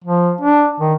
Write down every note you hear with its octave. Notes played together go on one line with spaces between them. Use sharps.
F3
D4
D#3